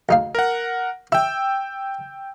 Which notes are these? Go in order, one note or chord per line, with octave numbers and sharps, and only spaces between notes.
D2 D#4 F5
A#4 F#5
E4 G5 E6